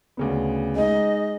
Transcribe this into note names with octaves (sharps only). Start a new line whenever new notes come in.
D2 C#3 B3
G#3 D#4 D#5